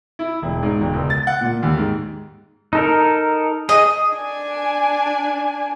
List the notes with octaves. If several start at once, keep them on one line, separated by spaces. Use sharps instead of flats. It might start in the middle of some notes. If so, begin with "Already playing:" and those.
E4
E1
G#2
E1
C#2
A6
F#5
A#2
D#2
G#2
D#4 A4 A#4
G#4 D#5
D4 G#5